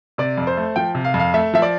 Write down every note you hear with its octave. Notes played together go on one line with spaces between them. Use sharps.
C3 D5
F2
C5
A3
F3 G5
C3
F5
F2
F5
A3 E5
F3 E5
D5